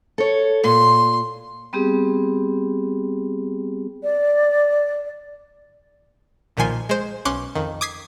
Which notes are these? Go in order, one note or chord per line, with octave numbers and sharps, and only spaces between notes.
A4 C#5
A#2 C6
G3 B3 C4 G4 G#4
D5
B1 A#2 D#3 F3 G#5 C6
G#3 C5
B1 C#4 C6 D6 F#6
F2 D#3
D6 D#6 G#6 B6 C7